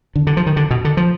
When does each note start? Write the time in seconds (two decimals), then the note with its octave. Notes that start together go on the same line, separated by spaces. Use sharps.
0.16 D3
0.27 D3
0.37 F3
0.46 D#3
0.57 D3
0.71 B2
0.85 D3
0.97 F3